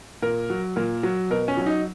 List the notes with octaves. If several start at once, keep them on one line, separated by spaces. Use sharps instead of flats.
A#2 A#4
F#3
A#2 A#4
F#3
B2 A#4
C#4
F#3
C#4
D#4